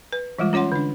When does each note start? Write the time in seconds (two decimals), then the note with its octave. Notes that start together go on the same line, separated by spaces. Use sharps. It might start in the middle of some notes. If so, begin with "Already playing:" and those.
0.13 B4
0.39 E3 G3 G#3 F4
0.53 C#4 F4 C#5 F#5 C6
0.72 D3 D4